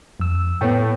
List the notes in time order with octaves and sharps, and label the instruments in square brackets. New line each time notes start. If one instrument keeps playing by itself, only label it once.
[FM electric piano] F2 E6
[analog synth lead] A2 [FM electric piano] B3 C#5 G5